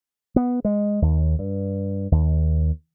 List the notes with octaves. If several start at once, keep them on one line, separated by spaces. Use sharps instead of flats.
B3
G#3
D#2
G2
D#2